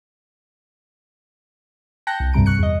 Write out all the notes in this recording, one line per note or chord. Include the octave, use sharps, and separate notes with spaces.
G5 A5 F#6 G6 A#6 C#7
C2
D2 G2 C3 G3 A#5 D7
C#6 F#6 C#7
E2 D#5